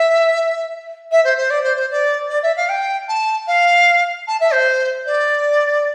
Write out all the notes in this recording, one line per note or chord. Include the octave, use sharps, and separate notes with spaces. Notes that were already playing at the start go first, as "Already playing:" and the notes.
Already playing: E5
E5
C5
C5
D5
C5
C5
D5
D5
E5
F5
G5
A5
F5
A5
E5
C5
D5